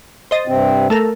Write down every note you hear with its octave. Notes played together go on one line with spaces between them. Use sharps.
C5 D#5 A6
G2 C3 C4
A3 A4 A#4